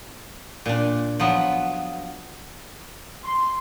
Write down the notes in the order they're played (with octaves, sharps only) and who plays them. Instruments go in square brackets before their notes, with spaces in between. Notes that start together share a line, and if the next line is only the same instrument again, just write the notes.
[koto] A#2 D4
F3 F#3 B3
[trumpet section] C6